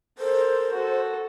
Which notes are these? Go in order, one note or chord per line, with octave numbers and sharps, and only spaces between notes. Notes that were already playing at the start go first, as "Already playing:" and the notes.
A4 A#4 C5
F#4 A4